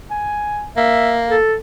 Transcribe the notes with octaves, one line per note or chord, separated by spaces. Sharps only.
G#5
A#3 E5
A4